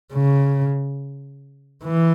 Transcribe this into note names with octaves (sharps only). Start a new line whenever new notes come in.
C#3
E3